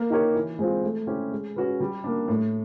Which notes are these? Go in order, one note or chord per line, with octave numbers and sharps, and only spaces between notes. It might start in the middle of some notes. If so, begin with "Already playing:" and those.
Already playing: A#3
D#4 G4 A#4 C#5
E3
G#3 C4 F4
A3
C#4 E4 G4 C5
G#3
C#4 F#4 B4
G3
A#3 D4
A2